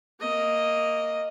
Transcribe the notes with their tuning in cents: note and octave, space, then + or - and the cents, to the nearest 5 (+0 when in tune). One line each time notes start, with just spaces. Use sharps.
A#3 -5 D#5 +0